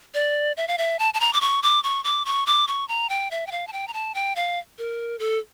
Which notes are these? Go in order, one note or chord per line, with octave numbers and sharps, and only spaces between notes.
D5
E5
F5
E5
A5
A5
A#5
D6
C#6
D6
C#6
D6
C#6
D6
C#6
A#5
G5
E5
G5
F5
A5
G5
A#5
A5
G5
F5
A#4
A4